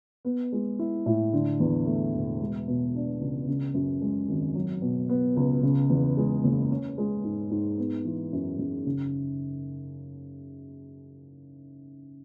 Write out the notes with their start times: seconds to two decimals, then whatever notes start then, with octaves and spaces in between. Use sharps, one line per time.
0.25 B3
0.52 G#3
0.79 E4
1.06 A2
1.33 D3
1.60 E2
1.86 A3
2.13 E1
2.41 G#3
2.68 B2
2.95 D4
3.21 C#2
3.48 C#3
3.74 F#2
4.01 G#3
4.28 G#1
4.55 F#3
4.82 B2
5.09 B3
5.36 C#2
5.63 C#3
5.90 E2
6.17 G#3
6.44 F#1
6.71 C#4
6.98 G#3
7.24 G#2
7.51 G#2
7.78 B3
8.05 E3
8.33 F#2
8.59 F#2
8.86 C#3